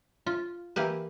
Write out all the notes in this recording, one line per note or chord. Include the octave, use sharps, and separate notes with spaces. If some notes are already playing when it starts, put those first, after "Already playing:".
F4
E3 A#3 G4 B4